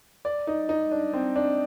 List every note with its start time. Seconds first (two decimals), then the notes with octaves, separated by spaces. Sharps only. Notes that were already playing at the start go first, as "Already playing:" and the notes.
0.25 D5
0.47 D#4
0.69 D#4
0.91 D4
1.13 C4
1.36 D4